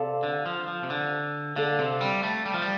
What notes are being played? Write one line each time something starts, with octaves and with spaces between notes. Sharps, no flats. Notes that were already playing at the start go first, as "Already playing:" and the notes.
Already playing: C3 A4 D5 F5 A5
D3
F3
F3
C3
D3
D3 A4 D5 F5
C3
G3
A3
G3
F3
G3